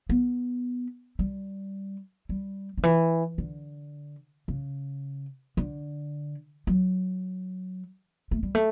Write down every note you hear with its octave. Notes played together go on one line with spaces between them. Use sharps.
B3
G3
G3
D3
E3
D3
C#3
D3
F#3
A3
G3
A3